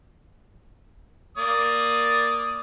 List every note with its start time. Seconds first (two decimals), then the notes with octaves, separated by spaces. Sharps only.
1.38 A#3 D5 D#6